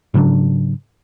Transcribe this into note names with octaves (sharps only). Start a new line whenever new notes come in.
G#2 C#3 F#3 D4